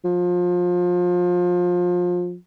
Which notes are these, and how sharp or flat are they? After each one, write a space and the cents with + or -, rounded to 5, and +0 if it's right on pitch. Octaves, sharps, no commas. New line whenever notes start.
F3 +25